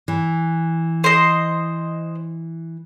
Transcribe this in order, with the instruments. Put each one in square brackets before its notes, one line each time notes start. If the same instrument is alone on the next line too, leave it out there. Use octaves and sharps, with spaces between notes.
[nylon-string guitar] E3
[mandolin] C5 D#5